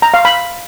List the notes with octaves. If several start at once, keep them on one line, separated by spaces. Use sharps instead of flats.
A#5
F5
B5